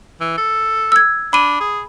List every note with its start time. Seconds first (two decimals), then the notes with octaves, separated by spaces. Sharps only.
0.20 E3
0.38 A4
0.92 E6 G#6
1.33 D4 B5 D#7
1.60 G#4